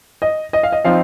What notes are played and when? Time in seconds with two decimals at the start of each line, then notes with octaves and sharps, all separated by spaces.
0.22 D#5
0.53 D#5
0.63 F5
0.72 D#5
0.85 F3 C4 D#4 F5